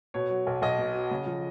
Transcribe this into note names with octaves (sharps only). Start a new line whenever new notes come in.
B2 C#5
F#3
B1
B1 D#5
B2
F#3
C#3
F3